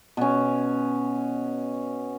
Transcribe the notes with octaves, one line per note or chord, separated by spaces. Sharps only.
B2 C#4